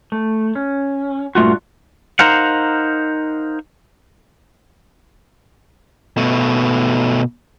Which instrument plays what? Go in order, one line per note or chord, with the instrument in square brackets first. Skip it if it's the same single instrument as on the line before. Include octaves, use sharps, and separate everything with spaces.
[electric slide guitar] A3
C#4
G2 A#2 A3 F4 F#4
[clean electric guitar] D#4 A#4 C5 F5 F#5
[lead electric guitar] B2 A3